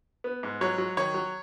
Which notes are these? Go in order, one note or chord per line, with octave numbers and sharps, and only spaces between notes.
B3
G#2
F#3 C#5
F#3
D#3 C#5
F#3